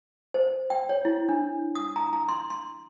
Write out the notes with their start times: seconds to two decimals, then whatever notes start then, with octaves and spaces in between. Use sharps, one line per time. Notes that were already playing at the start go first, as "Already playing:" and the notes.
0.34 C5
0.70 G5
0.89 C#5
1.05 E4
1.29 D4
1.75 D#6
1.96 A#5
2.13 A#5
2.29 C6
2.50 C6